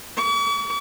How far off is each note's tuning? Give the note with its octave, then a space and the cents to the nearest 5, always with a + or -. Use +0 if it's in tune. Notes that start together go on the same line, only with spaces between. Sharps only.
C#6 +45